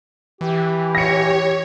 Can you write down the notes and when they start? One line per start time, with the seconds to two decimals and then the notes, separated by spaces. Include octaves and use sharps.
0.41 E3 G4
0.95 C#5 A#6 C#7